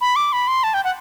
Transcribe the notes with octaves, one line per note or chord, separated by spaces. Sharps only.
B5
D6
B5
C6
A5
G5
F#5